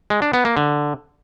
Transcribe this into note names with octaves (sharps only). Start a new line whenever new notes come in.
G#3
D4
B3
A#3
D3